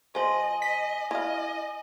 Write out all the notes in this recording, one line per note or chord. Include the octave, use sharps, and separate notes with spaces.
F3 C5 D#5 G#5 F#7
D#5 B6
E4 D#5 F5